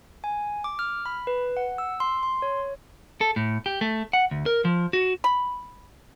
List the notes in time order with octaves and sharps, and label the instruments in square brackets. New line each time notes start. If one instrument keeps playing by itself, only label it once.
[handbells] G#5
D6
F6
B5
B4
F#5
E6
C6
C6
C#5
[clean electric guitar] A4
A2
G4
A3
F#5
D2
A#4
F3
F#4
[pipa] B5